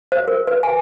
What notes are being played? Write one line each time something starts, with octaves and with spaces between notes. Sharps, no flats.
C5
A#4
B4
G#5